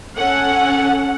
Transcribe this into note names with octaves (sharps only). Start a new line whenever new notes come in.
C#4 A4 F#5